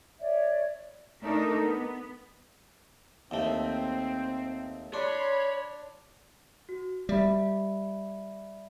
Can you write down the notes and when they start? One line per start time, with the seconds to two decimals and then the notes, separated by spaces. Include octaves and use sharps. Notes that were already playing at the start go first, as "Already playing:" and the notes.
0.18 C#5 D5 E5
1.22 A3 D4 D#4 A4 A#4
1.60 B3
3.31 D#2 A3 C4
4.94 D4 C#5 B5 C6
6.69 F#4
7.09 G3 D5 E5 B5